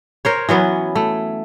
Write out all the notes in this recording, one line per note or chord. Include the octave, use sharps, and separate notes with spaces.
A#4 C5 C#5
E3 F#3 B3 C#4
A3